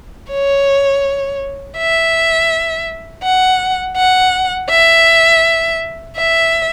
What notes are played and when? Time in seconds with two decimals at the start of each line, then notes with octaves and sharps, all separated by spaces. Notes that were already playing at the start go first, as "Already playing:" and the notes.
0.31 C#5
1.77 E5
3.23 F#5
3.97 F#5
4.70 E5
6.16 E5